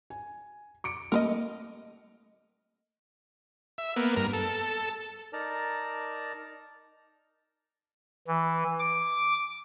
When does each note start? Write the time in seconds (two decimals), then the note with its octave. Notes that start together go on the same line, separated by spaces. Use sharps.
0.10 G#5
0.84 D6 C#7 D7
1.12 A3 A#3 A#4 B4 D#5
3.78 E5
3.96 A#3 B3
4.16 G2 A#4
4.33 A4
5.33 D#4 A#4 D5 A5 A#5
8.27 E3
8.79 D6